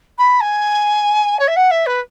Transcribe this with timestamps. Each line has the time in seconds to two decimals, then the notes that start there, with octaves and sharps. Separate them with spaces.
0.18 B5
0.40 G#5
1.39 C#5
1.47 E5
1.56 F#5
1.71 E5
1.86 B4